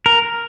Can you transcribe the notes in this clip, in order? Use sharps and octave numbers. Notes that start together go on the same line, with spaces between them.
A#4